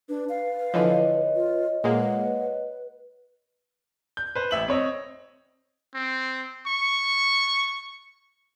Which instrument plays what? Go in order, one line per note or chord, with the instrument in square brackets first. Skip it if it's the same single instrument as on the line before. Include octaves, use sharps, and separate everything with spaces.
[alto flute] D4 [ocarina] B4
[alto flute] F5
[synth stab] D3 E3 F3 [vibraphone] C#5 D#5
[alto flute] F4
[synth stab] A#2 G#3 A#3 [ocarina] B4 [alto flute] F#5
[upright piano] G6
B4 C5
A1 E5 F#7
C4 C#5 D#5
[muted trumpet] C4
C#6